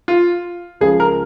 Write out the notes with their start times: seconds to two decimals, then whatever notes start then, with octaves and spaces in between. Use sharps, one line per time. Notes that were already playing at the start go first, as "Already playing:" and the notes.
0.08 F4
0.81 C#2 C#3 F3 G#3 G#4
1.00 A#4